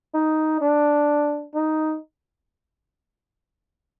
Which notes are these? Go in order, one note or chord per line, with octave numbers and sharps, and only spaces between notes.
D#4
D4
D#4